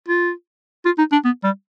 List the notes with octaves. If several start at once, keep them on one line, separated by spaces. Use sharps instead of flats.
F4
F4
D#4
D4
B3
G3